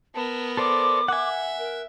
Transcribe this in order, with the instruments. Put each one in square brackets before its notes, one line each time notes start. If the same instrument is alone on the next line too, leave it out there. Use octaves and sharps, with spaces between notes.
[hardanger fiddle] B3 A#4 [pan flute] A5
[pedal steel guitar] A4 C5 D5 [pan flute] D6
[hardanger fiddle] E5 [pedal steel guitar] F#5 G#5
[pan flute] A#4